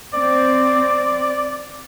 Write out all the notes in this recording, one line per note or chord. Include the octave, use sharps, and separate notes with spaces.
C4 D5